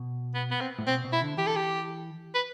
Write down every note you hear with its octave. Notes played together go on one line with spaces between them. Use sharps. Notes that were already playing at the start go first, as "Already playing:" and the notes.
Already playing: B2
B3
B3
C4
A2
B2 C4
B2
E4
D3
E3 G4
A4
G4
B4